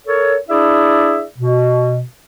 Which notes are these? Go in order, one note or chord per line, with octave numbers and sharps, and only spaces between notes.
A4 A#4 C#5
D4 E4 G#4 D5 E5
B2